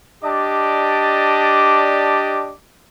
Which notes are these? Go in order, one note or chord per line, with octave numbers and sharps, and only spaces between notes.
D4 G4 D5 D#5 A5 D6